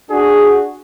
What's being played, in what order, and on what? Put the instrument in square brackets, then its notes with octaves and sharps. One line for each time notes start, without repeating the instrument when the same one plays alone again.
[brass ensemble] D4 F#4 G#4